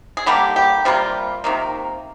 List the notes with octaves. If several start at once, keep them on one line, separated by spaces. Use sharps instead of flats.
G#4
D3 G3 A#3 G4
G4
C3 G3 A#3 F4
C3 D#3 A#3